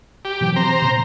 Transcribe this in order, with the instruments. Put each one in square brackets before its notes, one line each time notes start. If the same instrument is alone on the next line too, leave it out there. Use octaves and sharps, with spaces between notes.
[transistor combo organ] G4
[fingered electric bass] B2 E3 F#3
[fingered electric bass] C4 [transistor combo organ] C5 A#5
[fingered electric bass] A#2 C#3